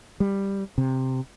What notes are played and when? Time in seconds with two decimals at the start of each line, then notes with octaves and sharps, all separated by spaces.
0.20 G3
0.78 C3